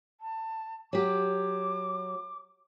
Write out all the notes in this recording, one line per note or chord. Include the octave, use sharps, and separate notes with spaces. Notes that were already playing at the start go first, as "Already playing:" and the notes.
A5
F#3 G4 D6